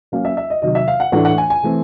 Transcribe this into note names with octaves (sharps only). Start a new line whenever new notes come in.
F#3 A#3 C#4 F5
E5
E5
D#5
C3 D#3 F#3 D#5
E5
F5
F#5
A2 E3 A3 D4 F#5
F#5
G#5
G#5
E3 A3 C4